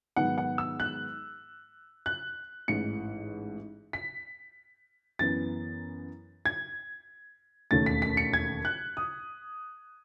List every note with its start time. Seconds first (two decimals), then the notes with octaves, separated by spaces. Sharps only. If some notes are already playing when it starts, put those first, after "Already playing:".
0.16 G#2 D#3 F#3 B3 F#5
0.38 F#5
0.58 E6
0.80 F#6
2.06 F#6
2.68 A1 G#2 E3 C#7
3.93 B6
5.19 F#2 E3 B3 A6
6.45 G#6
7.71 E1 D#2 D#3 A3 C#4 A6
7.86 B6
8.02 B6
8.17 C#7
8.33 G#6
8.65 F#6
8.97 D#6